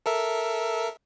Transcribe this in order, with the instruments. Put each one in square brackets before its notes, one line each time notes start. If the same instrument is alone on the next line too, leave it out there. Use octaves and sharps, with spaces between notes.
[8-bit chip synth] A4 A#4 E5